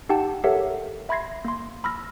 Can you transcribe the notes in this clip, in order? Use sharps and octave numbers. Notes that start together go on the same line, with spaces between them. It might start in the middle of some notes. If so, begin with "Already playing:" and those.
D#4 G4 F#5 G5 A5
G4 A4 A#4 C#5 E5 F#5
E5 B5 C6 G#6 A#6 C7
A#3 C6
B5 E6 F6 A#6